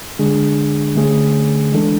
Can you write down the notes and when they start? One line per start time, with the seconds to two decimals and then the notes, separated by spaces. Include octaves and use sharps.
0.19 D3 G#3 D4 G#4
0.96 D3 A3 C#4 G#4
1.72 E3 G#3 D4 A4